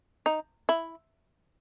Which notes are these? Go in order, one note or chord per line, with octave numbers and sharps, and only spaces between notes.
D#4
E4